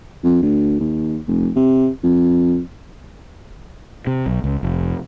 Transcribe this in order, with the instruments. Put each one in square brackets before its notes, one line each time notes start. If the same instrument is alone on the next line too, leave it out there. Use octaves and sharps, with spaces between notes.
[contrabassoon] F2
D2
D#2
F1
C3
F2
[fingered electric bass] C3
B1
C#2
F1